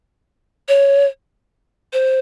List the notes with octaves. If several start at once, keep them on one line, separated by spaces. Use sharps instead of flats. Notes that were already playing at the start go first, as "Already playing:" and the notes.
C#5
C5